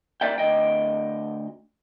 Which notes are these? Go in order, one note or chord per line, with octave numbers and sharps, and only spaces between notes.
A#3 D5 E5 G5
D2 D#5 G5